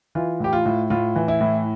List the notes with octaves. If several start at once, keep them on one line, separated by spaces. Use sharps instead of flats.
E3 F4
A2 G4
F4
A2
A2 F4
E3
E4
A2